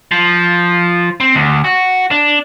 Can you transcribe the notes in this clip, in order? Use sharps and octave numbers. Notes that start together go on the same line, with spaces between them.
F3
C4
D2
F#4
D4